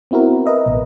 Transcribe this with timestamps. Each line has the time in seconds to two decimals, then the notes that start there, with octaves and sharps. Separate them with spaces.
0.11 B3 C4 E4 F#4 A#4
0.46 A#4 B4 D#5 E5
0.66 A1 B2